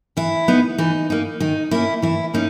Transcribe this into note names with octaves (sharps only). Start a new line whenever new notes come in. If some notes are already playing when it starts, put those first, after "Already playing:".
E3 E4
B3 D#4
E3 D#4
A#3 D#4
D#3 D#4
A#3 C#4 E4
E3 E4
A#3 C#4 D#4